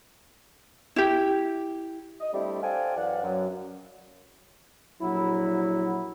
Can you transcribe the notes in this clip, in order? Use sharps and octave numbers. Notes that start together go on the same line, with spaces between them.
E4 G4
D#5
G3 A3 C4 D4 E4 G4
A4 C5 D5 F5 G5 G#5
F#2 E3 D5 F5 F#5
F#2
A#1 F#3 E4